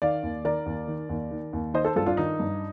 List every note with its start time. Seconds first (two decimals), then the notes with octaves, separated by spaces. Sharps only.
0.02 D#3 D5 F5
0.23 D#2
0.45 D#3 A#4 D5
0.66 D#2
0.88 D#3
1.09 D#2
1.31 D#3
1.53 D#2
1.74 D#3 C5 D#5
1.85 A4 C5
1.96 G2 F4 A4
2.06 D4 F4
2.17 D#3 D#4
2.40 G2